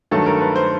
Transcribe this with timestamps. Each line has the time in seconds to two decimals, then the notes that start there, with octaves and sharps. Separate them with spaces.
0.11 G2 D#3 F#3 A3 A4
0.26 A#4
0.41 B4
0.56 C5